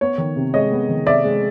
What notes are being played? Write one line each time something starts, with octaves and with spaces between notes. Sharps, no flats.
B3 C#5
D#3
C3
G#3 C#5 D#5
B3
D#3
C3 D5 E5
G#3